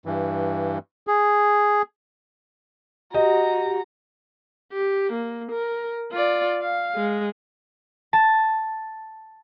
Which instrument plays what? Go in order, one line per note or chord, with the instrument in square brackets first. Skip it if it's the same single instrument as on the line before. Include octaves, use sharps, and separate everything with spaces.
[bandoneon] G2 E3
G#4
[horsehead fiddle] F#4 [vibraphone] G4 [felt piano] D#5 [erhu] A#5
[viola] G4
A#3
A#4
F4 D5
F5
G#3
[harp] A5